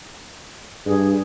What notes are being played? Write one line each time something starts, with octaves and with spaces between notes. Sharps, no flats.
G2 G#4